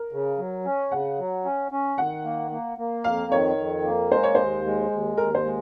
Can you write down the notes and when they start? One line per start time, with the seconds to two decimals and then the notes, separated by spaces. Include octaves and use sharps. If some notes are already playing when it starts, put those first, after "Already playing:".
Already playing: A#4
0.12 C#3
0.38 F#3
0.65 C#4
0.91 C#3 F#5
1.19 F#3
1.45 C#4
1.72 C#4
1.98 D#3 F#5
2.24 A#3
2.51 A#3
2.78 A#3
3.04 F2 F5
3.32 D#3 C#5
3.57 F2
3.84 A#3
4.11 G#3 C5
4.23 C#5
4.35 D#2 C5
4.65 G#3
4.91 D#2
5.17 D#2 A#4
5.35 C5
5.45 G#3